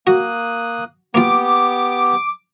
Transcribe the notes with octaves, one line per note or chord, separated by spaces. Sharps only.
A#3 F#4 D#6 F#6
A#3 B3 F4 G4 D6